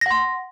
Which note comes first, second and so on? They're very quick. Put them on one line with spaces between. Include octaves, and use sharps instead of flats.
A#6 F#5 C6